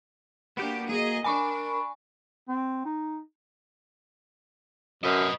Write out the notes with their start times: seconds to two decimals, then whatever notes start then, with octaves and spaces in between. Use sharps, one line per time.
0.57 A#3 B3 D4 F#4 G4 G6
0.89 A#3 F#4 G#4 D#5
1.24 D4 A#4 G#5 B5 C#6 D6
2.48 C4
2.86 D#4
5.03 F#2 B4 D#5